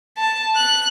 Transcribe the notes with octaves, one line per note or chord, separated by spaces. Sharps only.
A5
F#6